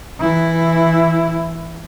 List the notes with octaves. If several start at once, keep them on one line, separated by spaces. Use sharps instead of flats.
E3 E4